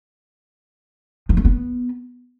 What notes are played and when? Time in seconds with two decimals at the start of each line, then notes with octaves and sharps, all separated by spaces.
1.29 F3
1.37 A3
1.45 B3